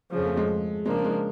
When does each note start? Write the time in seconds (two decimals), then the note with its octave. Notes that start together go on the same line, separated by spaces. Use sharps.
0.12 F2 C#3 F3
0.25 A3
0.37 G#3
0.86 C#3 F3 G#3 A#3 D4
1.04 G#3